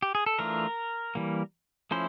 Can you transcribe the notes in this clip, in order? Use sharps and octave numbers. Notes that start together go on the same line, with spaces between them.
G4
G#4
A4
E3 A3 D4 F4 A#4
E3 G3 A#3
F3 A3 C#4 E4 C5